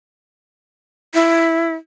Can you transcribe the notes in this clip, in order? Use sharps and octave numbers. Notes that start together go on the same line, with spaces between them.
E4